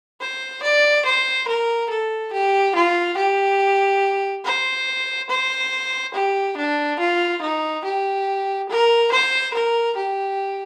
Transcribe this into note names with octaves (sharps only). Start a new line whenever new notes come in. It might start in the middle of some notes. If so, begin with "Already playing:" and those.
C5
D5
C5
A#4
A4
G4
F4
G4
C5
C5
G4
D4
F4
D#4
G4
A#4
C5
A#4
G4